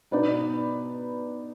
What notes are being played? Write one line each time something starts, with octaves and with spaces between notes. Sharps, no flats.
B2 B3 D#4 B4 D5